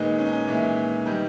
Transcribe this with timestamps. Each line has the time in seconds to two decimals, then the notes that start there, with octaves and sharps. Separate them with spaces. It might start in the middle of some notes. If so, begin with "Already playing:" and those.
Already playing: A#2 D#3 G#3 B3 D#4
0.18 C#4
0.26 D#4
0.32 C#4
0.48 A#2 E3 G#3 B3 E4
1.06 D#3 G3 B3